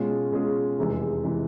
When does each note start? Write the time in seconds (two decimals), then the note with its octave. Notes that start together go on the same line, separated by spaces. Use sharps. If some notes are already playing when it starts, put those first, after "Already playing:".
Already playing: B2 G#3 C#4 F4 G#4
0.32 B2 G#3 C#4 F4 G#4
0.78 F1 E2 C3 E3 G#3
1.23 C3 E3 G#3